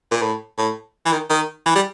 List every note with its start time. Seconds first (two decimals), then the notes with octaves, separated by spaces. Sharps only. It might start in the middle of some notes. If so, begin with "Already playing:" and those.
0.11 A#2
0.22 A2
0.58 A2
1.06 E3
1.12 D#3
1.30 D#3
1.66 E3
1.75 G3